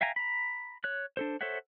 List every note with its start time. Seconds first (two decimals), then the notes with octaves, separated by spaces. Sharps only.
0.01 E5 F5 G5 G#5 A#5
0.16 A#5 B5
0.84 C#5 F#6
1.17 D4 A4 C5
1.41 A4 C5 C#5 E5 F#5